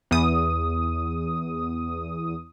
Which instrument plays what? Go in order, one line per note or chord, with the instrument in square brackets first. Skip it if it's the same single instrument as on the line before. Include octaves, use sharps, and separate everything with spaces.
[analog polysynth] E2 D#6